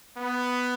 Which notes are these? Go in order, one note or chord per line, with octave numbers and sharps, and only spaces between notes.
B3